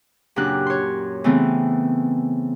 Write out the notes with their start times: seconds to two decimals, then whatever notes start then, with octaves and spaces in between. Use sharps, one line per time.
0.36 F#2 A#2 C#3 D4 G4 F#6
0.67 C#5 C6
1.24 C#3 E3 A3 B3 C4